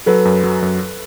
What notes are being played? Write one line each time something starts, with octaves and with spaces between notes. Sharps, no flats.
F#3 A4 B4
F#2
F#3
F#2